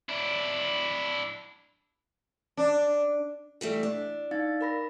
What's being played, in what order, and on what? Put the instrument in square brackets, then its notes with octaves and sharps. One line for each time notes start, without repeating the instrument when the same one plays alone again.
[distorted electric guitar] D4 E4
[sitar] D4
[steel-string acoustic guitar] E3 G3 A3
D4
[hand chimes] D#4 F5 A6
A#4 B5 A#6